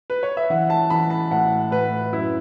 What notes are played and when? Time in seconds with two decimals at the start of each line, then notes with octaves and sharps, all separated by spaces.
0.10 B4
0.23 C#5
0.37 E5
0.50 E3 F#5
0.70 A5
0.90 E3 B5
1.10 A5
1.31 A2 F#5
1.71 A2 B4
2.12 F#2 E4